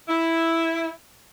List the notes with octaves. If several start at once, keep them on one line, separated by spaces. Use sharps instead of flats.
E4